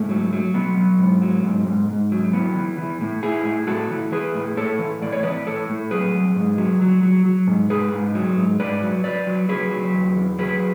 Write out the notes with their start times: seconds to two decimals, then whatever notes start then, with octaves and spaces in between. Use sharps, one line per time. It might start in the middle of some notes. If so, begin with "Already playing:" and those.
Already playing: G#2 A3
0.09 F#3
0.33 F#3
0.54 F#3 B3
0.77 F#3
0.99 G#2
1.22 F#3
1.44 G#2
1.66 G#2
1.88 G#2
2.11 F#3
2.33 E3 B3
2.56 E3
2.78 E3
3.01 A2
3.23 A2 E4 G#4
3.45 A2
3.67 A2 F#4 A4
3.91 E3
4.12 E3 G#4 B4
4.35 A2
4.57 A2 A4 C#5
4.79 E3
5.02 A2 D5
5.12 C#5
5.23 E3 B4 D5
5.47 A2 A4 C#5
5.69 A2
5.91 F#3 G#4 B4
6.14 F#3
6.36 G#2
6.58 F#3
6.81 F#3
7.03 F#3
7.26 F#3
7.47 G#2
7.70 G#2 G#4 B4
7.93 G#2
8.15 F#3
8.37 G#2
8.60 G#2 B4 D5
8.82 F#3
9.04 F#3 B4 D5
9.27 F#3
9.49 F#3 G#4 B4
9.71 F#3
9.93 E2
10.16 E2
10.38 F#3 G#4 B4